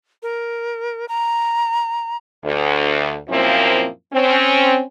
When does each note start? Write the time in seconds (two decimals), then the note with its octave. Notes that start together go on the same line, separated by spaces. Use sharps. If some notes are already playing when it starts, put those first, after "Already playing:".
0.23 A#4
1.09 A#5
2.44 D2
3.29 F#2 A#2 F3 A#3 C4 E4
4.13 C4 C#4